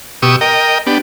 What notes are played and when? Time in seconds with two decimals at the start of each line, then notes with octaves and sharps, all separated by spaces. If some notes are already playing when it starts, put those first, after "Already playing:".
0.22 B2 G4 C#6 D#6 E6
0.41 A#4 D#5 G5
0.87 B3 D4 G4